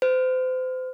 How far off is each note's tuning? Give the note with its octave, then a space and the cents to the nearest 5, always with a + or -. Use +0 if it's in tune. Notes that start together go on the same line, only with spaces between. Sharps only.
C5 -35